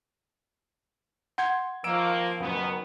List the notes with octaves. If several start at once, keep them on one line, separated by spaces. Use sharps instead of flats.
F#5 C6 G6 G#6
D#3 F3 A#3 E6 D7 E7
F#1 F#2 D#3 B3